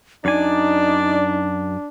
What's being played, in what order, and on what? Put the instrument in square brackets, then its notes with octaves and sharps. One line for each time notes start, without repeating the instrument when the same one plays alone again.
[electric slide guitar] F#2 G#5 [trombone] D4 [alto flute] D#4 [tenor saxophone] D5